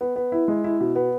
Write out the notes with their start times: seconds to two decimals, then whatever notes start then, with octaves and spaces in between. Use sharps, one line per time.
0.01 B3
0.16 B3
0.32 E4
0.48 G#3
0.64 E4
0.80 B2
0.96 B3